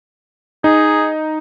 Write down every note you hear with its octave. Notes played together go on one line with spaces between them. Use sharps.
D#4 G#4